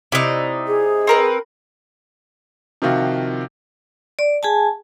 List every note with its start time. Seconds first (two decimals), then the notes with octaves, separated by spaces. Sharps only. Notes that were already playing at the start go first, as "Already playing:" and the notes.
0.12 C3 D#4 E4 D5 F#6
0.68 G#4
1.07 C4 A#4 B4
2.82 C3 D#3 F3 F4 F#4
4.19 D5
4.43 G#4 G#5 A5